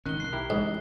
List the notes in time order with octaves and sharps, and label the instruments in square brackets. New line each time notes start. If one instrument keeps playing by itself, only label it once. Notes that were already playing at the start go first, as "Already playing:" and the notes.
[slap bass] G#1 C#4 [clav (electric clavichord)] D#3 [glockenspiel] F#6 G7
[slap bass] B1 [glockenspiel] F#6 C7
[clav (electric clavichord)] E4 G4 A#4
[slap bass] A1 [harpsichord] G#2